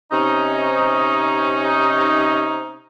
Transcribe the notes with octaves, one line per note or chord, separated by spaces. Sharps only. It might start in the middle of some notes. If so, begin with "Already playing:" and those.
C3 C#4 D#4